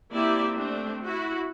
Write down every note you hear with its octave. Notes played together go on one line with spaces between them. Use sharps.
A#3 C4 E4 G4 D5 E5
A3 C4 D4
E4 F#4